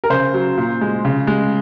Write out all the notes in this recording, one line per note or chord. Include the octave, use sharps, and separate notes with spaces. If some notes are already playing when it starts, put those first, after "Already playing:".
A#4
C#3 C5
F#3
A#2
G#3
C#3
G#3